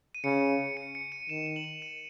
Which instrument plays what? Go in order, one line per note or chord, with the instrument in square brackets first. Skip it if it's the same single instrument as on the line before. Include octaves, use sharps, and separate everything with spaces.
[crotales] D#7
[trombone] C#3 [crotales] C#7
[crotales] C#7
C#7
D#7
[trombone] D#3 [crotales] E7
[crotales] E7
F#7
E7
D#7